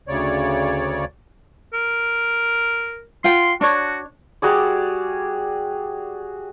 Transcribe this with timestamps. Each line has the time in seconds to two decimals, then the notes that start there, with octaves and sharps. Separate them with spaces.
0.08 D2 C#3 C#5 D5
1.74 A#4
3.24 F4 F#5 G5 C6
3.61 D4 F#4 C#5
4.42 G3 F#4 G#4 D5